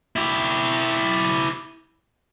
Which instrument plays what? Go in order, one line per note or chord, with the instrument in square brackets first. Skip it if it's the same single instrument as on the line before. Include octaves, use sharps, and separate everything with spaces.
[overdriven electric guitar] E4 G4